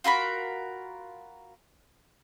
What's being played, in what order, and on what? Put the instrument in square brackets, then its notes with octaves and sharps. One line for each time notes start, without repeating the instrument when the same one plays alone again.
[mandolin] F4 F#4 A#4 B5